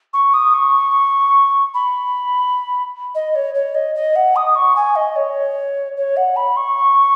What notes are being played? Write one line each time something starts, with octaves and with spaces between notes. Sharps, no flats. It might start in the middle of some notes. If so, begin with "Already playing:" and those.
C#6
D#6
C#6
B5
D#5
C#5
C#5
D#5
D#5
F#5
D#6
C#6
G#5
D#5
C#5
C#5
F#5
B5
C#6